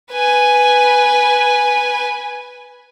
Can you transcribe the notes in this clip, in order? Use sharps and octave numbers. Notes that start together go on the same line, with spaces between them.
B4 G#5